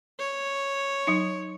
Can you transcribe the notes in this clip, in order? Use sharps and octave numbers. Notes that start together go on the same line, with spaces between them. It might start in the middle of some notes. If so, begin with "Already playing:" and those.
C#5
F#3 D#4